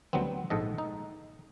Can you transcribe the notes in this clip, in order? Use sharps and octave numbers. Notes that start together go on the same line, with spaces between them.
D2 F#3 G3 B3 C4
A#1 G#2 A4 D#5
D#4